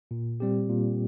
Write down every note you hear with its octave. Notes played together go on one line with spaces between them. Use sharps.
A#2
G3 C4 G4
A#2